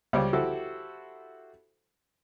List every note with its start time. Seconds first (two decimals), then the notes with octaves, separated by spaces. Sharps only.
0.13 C#2 G3 C5 C#5 F5 D6
0.33 E4 F#4 G4 A4 C5